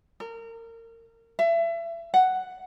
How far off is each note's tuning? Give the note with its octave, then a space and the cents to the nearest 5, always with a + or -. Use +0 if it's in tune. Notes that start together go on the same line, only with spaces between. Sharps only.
A#4 -30
E5 +30
F#5 +5